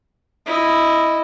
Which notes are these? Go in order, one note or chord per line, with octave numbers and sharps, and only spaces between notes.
E4 D#5